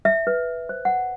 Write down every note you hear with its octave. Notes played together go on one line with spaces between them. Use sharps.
E5
B4
C5
F#5